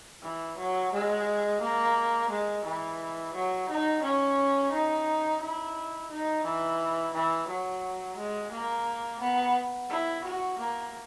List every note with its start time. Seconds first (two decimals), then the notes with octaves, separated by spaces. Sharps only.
0.23 E3
0.57 F#3
0.92 G#3
1.61 A#3
2.30 G#3
2.64 E3
3.34 F#3
3.69 D#4
4.02 C#4
4.72 D#4
5.41 E4
6.10 D#4
6.44 E3
7.14 E3
7.48 F#3
8.16 G#3
8.51 A#3
9.20 B3
9.90 E4
10.24 F#4
10.58 A#3